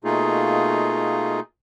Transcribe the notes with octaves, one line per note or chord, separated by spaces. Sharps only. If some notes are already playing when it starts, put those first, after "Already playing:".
B2 A3 A#3 D#4 F4 G#4